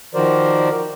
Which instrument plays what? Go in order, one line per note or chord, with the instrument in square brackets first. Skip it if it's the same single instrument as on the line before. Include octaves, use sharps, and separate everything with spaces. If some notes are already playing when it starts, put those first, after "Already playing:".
[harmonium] D#3 F3 F#4 A#4 C5 D5